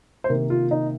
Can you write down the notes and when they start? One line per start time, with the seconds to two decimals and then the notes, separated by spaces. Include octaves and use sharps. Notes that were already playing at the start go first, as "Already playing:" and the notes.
0.24 C5
0.29 C3 D#3 A#3 A#4
0.50 F4
0.71 D#4